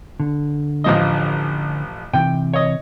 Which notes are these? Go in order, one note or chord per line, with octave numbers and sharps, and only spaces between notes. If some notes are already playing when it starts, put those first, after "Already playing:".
D3
A1 F3 D#5
C3 E3 G5
C#5 D#5